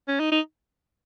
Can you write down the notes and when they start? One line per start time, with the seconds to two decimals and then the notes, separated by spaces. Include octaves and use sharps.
0.08 C#4
0.20 D#4
0.32 D#4